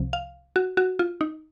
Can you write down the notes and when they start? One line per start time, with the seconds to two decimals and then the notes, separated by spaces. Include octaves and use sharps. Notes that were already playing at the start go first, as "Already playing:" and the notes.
Already playing: C2 C3 F3
0.13 F5
0.56 F#4
0.77 F#4
0.99 F4
1.21 D#4